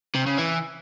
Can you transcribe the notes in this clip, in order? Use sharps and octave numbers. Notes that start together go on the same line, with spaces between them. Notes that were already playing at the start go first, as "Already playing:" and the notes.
C3
C#3
E3